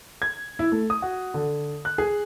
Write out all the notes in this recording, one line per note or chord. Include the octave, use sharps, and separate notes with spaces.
G#6
E4
A3
D#6
F#4
D3
F#6
G#4